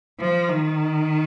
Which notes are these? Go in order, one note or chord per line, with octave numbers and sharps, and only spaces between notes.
F3
D#3